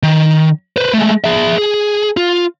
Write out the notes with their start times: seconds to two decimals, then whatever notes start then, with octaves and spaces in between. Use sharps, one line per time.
0.03 D#3
0.77 B4 C5
0.93 G#3 A3
1.24 G#4 E5
1.58 G#4
2.17 F4